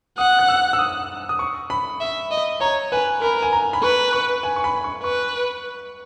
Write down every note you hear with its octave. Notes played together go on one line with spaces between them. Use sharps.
F#5 D#6
F#6
E6
E6
D#6
D#6
C#6
B5
E5
D#5
C#5 A#5
B4 G#5
A#4 B5
G#5
A#5
B5
B4 C#6
C#6
G#5
C#6
B5
C#6
B4 C#6